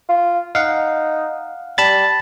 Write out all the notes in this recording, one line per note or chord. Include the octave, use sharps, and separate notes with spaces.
F4
D#4 F5 F#5
G3 A5 B5 A6